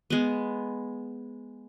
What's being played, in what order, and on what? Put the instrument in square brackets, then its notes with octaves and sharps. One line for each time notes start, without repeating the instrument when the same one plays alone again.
[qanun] G#3 B3